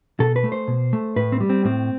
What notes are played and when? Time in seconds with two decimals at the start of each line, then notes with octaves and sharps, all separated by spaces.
0.20 B2 A4
0.36 B4
0.44 A3
0.52 C5
0.68 B2
0.93 A3
1.16 A2 B4
1.32 C4
1.40 G3
1.50 C4
1.65 A2 C4